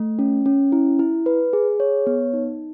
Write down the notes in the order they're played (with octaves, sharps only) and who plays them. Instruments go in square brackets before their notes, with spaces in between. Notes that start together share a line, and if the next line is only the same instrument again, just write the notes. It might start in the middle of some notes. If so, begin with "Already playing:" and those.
Already playing: [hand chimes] A3
C#4
C#4
E4
E4
B4
G#4
C#5
B3
D#4